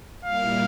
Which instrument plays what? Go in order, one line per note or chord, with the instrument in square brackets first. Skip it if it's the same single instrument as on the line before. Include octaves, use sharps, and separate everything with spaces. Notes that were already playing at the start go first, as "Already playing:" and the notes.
[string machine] A#2 G3 A#3 E4 A#4 [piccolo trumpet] F5